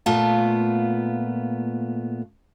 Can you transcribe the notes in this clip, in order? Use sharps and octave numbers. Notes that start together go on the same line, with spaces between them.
A#2 A3 B3 F4 A5